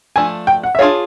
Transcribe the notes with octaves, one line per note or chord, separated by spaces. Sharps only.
F3 A3 D4 G#5
G5
F#5
E5
D4 F4 G#4 C#5 F5